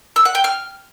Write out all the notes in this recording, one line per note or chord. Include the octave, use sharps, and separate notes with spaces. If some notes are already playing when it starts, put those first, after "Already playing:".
E6
F#5
G5
F6